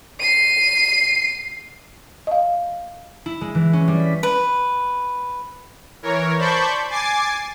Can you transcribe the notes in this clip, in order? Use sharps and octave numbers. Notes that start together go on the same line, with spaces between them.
C7 D#7
D#5 F5
E4
G#3
E3
C#4
G3
B6
B4
E3 A#4 C#5
C5 D5 A5 B5 C#6 G6
G#5 D6 A6 C7